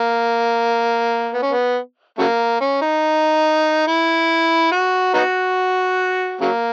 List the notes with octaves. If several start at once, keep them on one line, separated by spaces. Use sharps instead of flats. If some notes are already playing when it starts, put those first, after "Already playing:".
Already playing: A#3
B3
C#4
B3
C#3 F#3 A#3
C#4
D#4
E4
F#4
B3 D#4 F#4
C#3 F#3 A#3